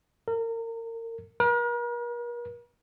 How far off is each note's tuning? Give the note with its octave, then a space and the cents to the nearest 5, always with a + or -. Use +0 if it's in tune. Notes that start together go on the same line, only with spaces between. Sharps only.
A#4 -30
A#4 +45